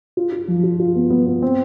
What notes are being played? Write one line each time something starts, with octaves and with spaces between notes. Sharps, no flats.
F4
F4
F3
F4
F4
B3
B3
B3
C4